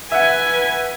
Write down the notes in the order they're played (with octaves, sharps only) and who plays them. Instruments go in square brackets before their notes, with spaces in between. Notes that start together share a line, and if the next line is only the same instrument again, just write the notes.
[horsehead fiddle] B4 G#5 [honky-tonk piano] E5 F#5